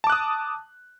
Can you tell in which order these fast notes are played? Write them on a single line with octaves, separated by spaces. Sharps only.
A5 D6 F#6 D#6